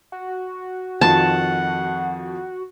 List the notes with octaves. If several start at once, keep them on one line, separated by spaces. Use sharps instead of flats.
F#4
F2 D#3 F3 F#5 A5